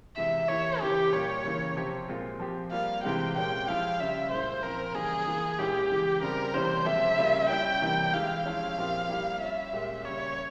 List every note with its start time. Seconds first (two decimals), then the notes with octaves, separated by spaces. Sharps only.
0.17 C3 E3 G#3 E5
0.48 E3 A#3 E4 G4 C#5
0.80 C#3 E3 A#3 G4
1.13 A#2 G3 A#3 F4 C#5
1.44 C#3 E3 A#3
1.76 C3 F3 C4 G4
2.08 A#2 G#3 C4 F4
2.39 F3 C4 G4
2.72 G3 A#3 F4 F5
3.03 C3 E3 G#3 C4 G4 G5
3.35 A#2 G#3 C#4 G4 G5
3.67 F3 G#3 E4 G4 F5
3.99 C#3 G3 C#4 F4 E5
4.30 A#2 G#3 E4 C5
4.62 A#2 F3 C4 E4 A#4
4.94 C#3 E3 G3 A#3 G#4
5.27 E3 A#3 F4
5.58 A#2 G#3 C#4 E4 G4
5.90 C#3 E3 G#3
6.22 C#3 G3 C4 A#4
6.54 C3 E3 G3 A#3 C#4 C5
6.85 C3 F3 G#3 C#4 G4 E5
7.18 C#3 G3 A#3 C#4 F4
7.49 G3 C#4 E4 G5
7.81 C3 E3 G3 A#3
8.13 E3 G#3 E4 G4 F5
8.45 F3 G#3 C#4 E4
8.77 A#2 F3 C4 E4 G4
9.09 G3 A#3 E4 G4
9.41 G3 C#4 F4 E5
9.73 A#2 G#3 C#4 G4
10.04 C#3 G3 A#3 C#5